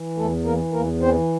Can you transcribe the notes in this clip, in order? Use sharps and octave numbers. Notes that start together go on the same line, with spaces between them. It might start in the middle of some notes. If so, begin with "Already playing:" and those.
Already playing: E3
E2 A3 A4
E3 A#3 A#4
E2 A#3 A#4
E3 C4 C5